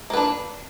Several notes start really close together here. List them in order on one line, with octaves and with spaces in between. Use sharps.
A#3 B4 D4